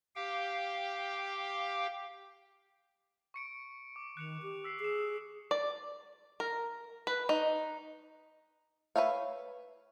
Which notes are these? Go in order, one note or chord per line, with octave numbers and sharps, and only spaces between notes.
G4 F5 G5
C#6 C#7 D7
D6
D#3 F#6 C#7 F7
G4
E6 B6 C7
G#4 C7 E7
D5
A#4
B4
D#4
B4 C#5 E5 F5